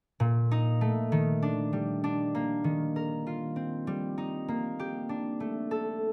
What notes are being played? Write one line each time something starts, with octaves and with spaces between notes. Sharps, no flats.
A#2
D#4
A3
D#3
D4
G3
D4
A#3
D#3
A#4
F4
C4
G3
D#4
A#3
G4
D4
A3
A4